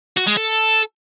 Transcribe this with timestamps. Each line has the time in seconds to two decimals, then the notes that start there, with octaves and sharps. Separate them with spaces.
0.17 F#4
0.27 G#3
0.37 A4